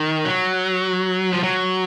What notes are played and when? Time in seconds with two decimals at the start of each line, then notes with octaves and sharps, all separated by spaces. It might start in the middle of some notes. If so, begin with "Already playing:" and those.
Already playing: D#3
0.25 F#3
1.32 F3
1.43 F#3